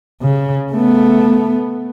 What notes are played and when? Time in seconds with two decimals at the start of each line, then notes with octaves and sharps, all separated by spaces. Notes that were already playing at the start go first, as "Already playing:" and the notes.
0.22 C#3
0.72 A3 B3